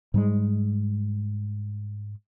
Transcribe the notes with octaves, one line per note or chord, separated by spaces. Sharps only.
G#2 G3 G#3